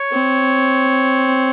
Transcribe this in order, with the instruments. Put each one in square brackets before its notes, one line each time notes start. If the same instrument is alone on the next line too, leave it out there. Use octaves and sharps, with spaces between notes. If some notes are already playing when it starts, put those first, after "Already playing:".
Already playing: [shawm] C#5
[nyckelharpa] C4